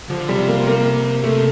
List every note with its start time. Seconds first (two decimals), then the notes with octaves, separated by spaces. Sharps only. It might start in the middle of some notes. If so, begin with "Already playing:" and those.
0.09 D3 F3
0.29 C3 G3
0.48 A#3
0.67 A#3
1.24 C3 A3